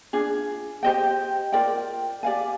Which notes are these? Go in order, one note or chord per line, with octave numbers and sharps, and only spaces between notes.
D4 F4 G#4
G4 C5 D#5 G5
F4 A#4 D5 G5
G4 D5 F5 G#5